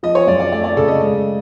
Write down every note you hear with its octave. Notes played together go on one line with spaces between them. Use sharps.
F3 D#5
C#5
F#2 D5
D5
A3 D5
D5
C#3 A4
D#5
G#3